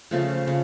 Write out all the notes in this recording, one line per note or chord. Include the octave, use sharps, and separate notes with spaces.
C#3 F3 A3
C#3